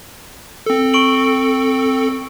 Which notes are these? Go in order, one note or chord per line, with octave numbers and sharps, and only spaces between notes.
C4 A4
C#6 D7 F#7